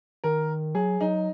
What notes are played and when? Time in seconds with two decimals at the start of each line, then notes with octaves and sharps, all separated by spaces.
0.24 D#3 A#4
0.75 F#3 G#4
1.01 F#3 D#4